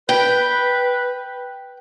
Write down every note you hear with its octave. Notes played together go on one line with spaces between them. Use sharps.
B4 G5